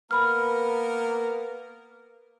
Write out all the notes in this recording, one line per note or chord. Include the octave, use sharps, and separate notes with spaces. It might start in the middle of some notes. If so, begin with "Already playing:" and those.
A#3 B3 A#4 B5 F6